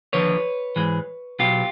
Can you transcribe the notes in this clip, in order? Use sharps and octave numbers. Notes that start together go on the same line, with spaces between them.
D#2 D3 F3 B4 C#5
G#2 E3 G#3
B1 B2 F#3 F4 G4